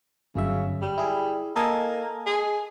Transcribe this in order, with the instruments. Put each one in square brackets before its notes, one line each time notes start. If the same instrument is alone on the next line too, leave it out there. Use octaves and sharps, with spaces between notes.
[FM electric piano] G1 F#2 E5 [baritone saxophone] C#3
[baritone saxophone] G3
[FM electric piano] E4 G#4
[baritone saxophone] A#3 [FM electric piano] A4 D#5 G#5
[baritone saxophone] G#4